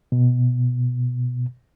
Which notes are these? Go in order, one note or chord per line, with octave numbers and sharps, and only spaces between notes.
B2